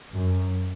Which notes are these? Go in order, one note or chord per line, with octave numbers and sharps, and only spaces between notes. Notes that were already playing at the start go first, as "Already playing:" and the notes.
F#2